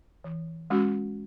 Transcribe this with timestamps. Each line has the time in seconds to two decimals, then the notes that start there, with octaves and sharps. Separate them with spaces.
0.24 E3
0.70 G#3 C#4 F#4